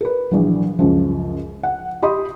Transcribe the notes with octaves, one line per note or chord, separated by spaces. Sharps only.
A#4 B4
A#1 E3 F#3
C#2 F#2 F3
F#5
G4 D#5 B5 C6 D#6